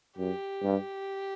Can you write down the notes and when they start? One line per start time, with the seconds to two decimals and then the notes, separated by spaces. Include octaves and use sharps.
0.18 F#2 G4
0.63 G2